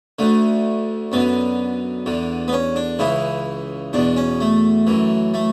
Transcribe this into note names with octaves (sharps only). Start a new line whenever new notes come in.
D2 D3 A3
F#2 D3 B3
E2 D3
B3
C#4
D4
C#2 C#3 E3 E4
E2 B2 D4
C#4
A3
F#2 E3
A3